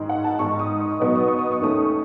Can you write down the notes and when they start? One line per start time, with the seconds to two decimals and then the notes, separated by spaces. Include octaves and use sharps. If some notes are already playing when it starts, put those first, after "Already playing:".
Already playing: G#2 D#3 G#3
0.09 F#5
0.24 A5
0.39 G#2 D#3 G#3 C#6
0.59 D#6
0.80 C#6
0.92 D#6
1.00 B2 F#3 B3 D#4 C#6
1.16 D#6
1.28 C#6
1.39 D#6
1.52 C#6
1.60 D#2 D#3 A3 C#4 D#6
1.75 C#6